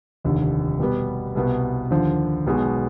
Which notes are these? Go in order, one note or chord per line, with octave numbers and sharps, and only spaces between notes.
F1 D#2 D3
B2 G3 B3
C2 B2 B3
D#2 D3 F3
B1 B2 G#3